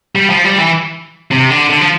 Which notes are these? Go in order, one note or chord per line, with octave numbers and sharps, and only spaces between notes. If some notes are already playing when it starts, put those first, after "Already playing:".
G3
F3
G3
E3
C3
D3
D3
F3